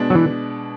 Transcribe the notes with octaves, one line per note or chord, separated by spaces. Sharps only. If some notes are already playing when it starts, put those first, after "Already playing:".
Already playing: B2 G#3 B3 D4
F#3
E3